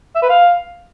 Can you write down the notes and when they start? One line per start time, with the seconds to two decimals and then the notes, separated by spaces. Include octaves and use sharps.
0.15 E5
0.22 B4
0.29 F5